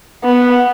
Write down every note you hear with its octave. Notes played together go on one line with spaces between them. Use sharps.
B3